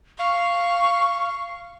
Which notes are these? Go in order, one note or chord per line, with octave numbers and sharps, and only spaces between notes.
F5 C#6